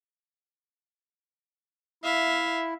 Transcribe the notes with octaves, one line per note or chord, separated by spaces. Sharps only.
E4 E5 F5